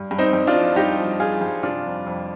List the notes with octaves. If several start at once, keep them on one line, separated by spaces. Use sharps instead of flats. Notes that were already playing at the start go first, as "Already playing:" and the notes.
Already playing: G2
G2
C4 D#4
G2
D4 F4
F3
G2 D#4 G4
F3
F3 F4 G#4
G2
C3 D4 F4
F2
F2